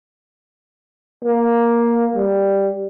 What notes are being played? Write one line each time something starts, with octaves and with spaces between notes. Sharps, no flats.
A#3
G3